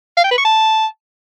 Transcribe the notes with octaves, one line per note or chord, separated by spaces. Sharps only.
F5
G5
B4
C#6
A5